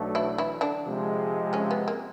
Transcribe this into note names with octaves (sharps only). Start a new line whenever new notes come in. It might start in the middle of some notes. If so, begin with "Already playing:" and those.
Already playing: B1 B2 F#3 A3 D4
E3 E4
E3 E4
D3 D4
C3 F3 G#3
C#3 C#4
B3
A#3